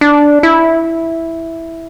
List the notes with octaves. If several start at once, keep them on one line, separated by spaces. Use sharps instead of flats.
D4
E4